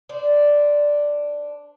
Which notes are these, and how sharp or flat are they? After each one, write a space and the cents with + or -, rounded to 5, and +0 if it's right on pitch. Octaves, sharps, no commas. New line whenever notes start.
D4 +0 C5 -15